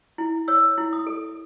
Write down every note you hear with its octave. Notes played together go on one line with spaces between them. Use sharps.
E4
C#5 E6
E4
D#6
A4